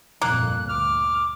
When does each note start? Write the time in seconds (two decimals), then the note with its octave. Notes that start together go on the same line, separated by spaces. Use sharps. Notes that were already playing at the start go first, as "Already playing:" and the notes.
0.21 G1 F2 A#2 A#3 F#6
0.69 D2 D6 F6